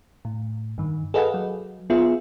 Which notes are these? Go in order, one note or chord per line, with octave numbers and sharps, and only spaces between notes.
A2
G2 D#3
G#4 A4 B4 D#5 F5 F#5
F#3
B3 F4 G#4 E5